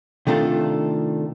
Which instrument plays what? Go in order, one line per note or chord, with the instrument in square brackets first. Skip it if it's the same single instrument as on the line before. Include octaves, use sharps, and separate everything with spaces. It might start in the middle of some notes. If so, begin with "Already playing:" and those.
[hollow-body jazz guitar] C3 D#3 A3 D4 F4 A4